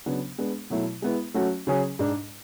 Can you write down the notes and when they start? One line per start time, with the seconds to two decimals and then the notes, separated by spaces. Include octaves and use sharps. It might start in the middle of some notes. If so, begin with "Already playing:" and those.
0.06 C#3 F#3 B3 D4
0.38 G#3 B3 D4
0.70 B2 F#3 A3 E4
1.02 G#3 B3 E4
1.34 F#3 A3 C#4 F#4
1.67 C#3 F#3 C#4 G#4
1.99 G#2 G#3 D4